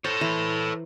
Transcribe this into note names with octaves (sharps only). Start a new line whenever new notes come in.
A4 C5 C#5
E3 A#5